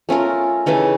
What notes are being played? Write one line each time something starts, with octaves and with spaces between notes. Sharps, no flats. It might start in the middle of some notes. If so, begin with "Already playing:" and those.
A3 C#4 F4 A#4
C#3 E3 A3 D#4